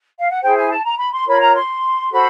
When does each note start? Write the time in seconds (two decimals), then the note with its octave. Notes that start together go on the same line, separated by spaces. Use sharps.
0.19 F5
0.30 F#5
0.42 E4 G#4 C5 G5
0.56 G#5
0.70 A5
0.84 A#5
0.98 B5
1.12 C6
1.26 F4 A#4 C#5 B5
1.40 A#5
1.55 C6
2.11 F#4 A4 C5 B5